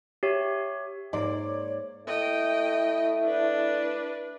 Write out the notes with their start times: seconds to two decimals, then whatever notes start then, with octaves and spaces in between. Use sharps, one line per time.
0.23 G4 C#5 E5
1.13 G#2 A#3 C#5 D5
2.07 A3 E4 D#5 G5
3.26 D4 B4